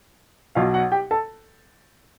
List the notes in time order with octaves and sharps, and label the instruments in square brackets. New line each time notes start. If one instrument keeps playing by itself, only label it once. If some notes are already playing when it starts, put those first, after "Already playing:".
[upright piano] B1 B2 F#3 F4 F5
F#4 F#5
G4 G5
A4 A5